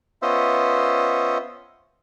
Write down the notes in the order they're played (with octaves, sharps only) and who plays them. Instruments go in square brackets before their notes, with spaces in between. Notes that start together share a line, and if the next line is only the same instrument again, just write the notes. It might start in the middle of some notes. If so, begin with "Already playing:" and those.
[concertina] B3 C#4 F4 C5 D#5 E5